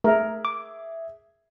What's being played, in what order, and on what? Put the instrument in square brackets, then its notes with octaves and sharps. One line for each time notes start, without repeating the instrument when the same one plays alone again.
[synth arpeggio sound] A3 [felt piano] G#4 E5 [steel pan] A#4
[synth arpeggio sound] D6